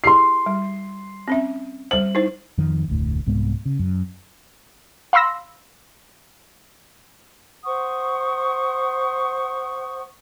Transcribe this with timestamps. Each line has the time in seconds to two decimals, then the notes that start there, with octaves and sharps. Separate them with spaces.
0.04 E4 G4 G#4 C6 C7
0.46 G3
1.28 C4 C#4 E5
1.91 G3 C5 F#7
2.15 D#4 E4 C5
2.58 F2 D#3 F3
2.88 F1 D2 A2
3.27 C2 G#2 G#3 B3
3.66 C#3
3.79 F#2
5.13 F5 B5 C6 E6 A#6
7.65 C5 F#5 C#6 D#6